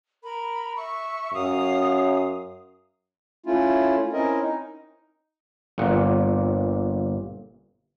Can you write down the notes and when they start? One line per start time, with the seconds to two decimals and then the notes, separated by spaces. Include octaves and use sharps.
0.23 A#4 B5
0.76 E5 C#6
1.33 F#2 F5 D#6
3.46 A3 C#4 E4 F4
4.12 C4 C#4 E4 A#4 D#5
4.40 D#4
5.78 G1 A#2 F#5